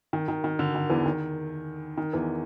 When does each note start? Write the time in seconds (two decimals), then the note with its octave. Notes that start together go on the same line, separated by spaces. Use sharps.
0.13 D#3
0.28 D#3
0.44 D#3
0.59 D3
0.75 D#3
0.89 E2 E3
1.06 D#3
1.97 D#3
2.13 E2 E3